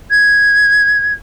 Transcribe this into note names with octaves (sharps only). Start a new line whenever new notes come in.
G#6